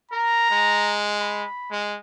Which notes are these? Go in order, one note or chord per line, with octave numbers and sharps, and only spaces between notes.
A#4 A#5
G#3
B5
G#3